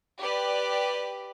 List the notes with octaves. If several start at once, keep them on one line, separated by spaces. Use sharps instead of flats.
G4 B4 D5